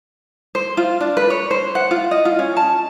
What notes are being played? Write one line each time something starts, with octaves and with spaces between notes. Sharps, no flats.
C5
F4
D4
B4
C#5
C5
F#5
F4
D#5
F4
C#4
A5